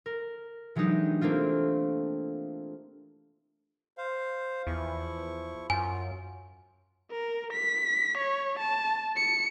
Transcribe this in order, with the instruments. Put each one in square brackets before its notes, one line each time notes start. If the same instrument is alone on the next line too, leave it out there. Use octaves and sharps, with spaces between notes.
[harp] A#4
E3 F#3 G#3 D4 D#4 G4
A3 A#3 C4 D4 F4
[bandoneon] C5 F5
[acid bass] E2 [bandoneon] F3 E4 C#6
[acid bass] F#2 [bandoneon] F4 [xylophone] G#5
[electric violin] A#4
B6
C#5
A5
C#7